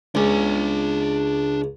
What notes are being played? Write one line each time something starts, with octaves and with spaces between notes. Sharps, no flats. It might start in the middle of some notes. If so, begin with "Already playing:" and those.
C#2 D4 G#5